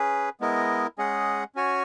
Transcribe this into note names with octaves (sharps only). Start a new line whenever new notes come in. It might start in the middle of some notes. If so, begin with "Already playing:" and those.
Already playing: C#4 G#4 B4
G#3 B3 E4 A#4 D#5
G#3 C#4 G#4 D#5 F#5
C#4 F#4 C#5 G#5